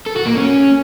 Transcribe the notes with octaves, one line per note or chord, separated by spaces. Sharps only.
A4
F#4
A#3
C#4